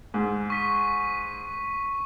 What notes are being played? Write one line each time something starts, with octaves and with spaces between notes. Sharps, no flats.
G#2
C#6 B6 D#7